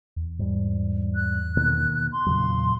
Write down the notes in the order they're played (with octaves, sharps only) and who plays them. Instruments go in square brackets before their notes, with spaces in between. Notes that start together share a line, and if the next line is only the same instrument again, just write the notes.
[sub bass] E2
[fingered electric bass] G#2 G3
[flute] F#6
[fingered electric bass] B2 D#3 A#3
[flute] C6
[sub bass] E2 [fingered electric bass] A#2 C#3 F#3